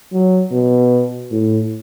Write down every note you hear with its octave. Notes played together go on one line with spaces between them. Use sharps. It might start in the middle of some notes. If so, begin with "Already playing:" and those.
F#3
B2
A2